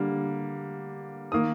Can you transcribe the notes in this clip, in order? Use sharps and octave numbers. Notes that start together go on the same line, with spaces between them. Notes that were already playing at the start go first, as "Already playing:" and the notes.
Already playing: D3 G3 A#3
D#3 A#3 D#6